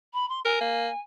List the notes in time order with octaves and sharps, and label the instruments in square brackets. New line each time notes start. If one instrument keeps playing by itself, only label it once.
[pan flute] B5
C6
[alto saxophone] A#4 [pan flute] G#5
[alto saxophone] A#3